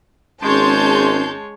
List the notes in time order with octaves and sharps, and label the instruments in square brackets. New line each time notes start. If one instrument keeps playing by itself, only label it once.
[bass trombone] G#1 [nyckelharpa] G#3 C#5 [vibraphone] C#4 [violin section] A5 C6 G6